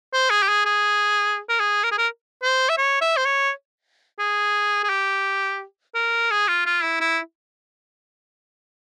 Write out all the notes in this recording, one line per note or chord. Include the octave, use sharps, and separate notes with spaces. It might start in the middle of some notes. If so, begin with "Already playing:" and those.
C5
G#4
G4
G#4
G#4
A#4
G#4
A#4
G#4
A#4
C5
E5
C#5
E5
C5
C#5
G#4
G#4
G4
A#4
G#4
F4
F4
E4
E4